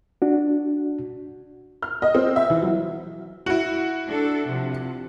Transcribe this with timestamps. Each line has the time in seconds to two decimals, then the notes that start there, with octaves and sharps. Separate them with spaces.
0.22 D4 F#4
1.82 F6
2.02 D#5
2.15 C4
2.36 E5
2.50 E3
2.62 F#3
3.46 E4 F#4
4.06 D4 A4
4.47 C3 F3